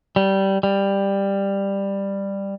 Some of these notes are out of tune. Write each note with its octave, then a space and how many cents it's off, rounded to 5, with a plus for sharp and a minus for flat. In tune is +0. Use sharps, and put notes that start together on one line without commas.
G3 -15
G3 +10